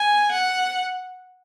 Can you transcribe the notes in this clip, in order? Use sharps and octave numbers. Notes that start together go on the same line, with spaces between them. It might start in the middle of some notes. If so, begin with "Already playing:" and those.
Already playing: G#5
F#5